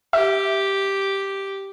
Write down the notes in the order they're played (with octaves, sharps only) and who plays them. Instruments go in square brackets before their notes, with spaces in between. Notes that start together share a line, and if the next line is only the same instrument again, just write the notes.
[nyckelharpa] G4 [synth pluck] E5